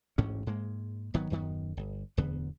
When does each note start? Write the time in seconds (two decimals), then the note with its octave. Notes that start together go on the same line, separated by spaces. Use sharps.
0.18 A1 D2 G#2 C#4
0.46 G#2 G#3 A#3
1.14 G#1 D#3 F#3 B3
1.30 D#1 F#2 D#3 B3
1.77 G1
2.17 D1 E2 D3 B3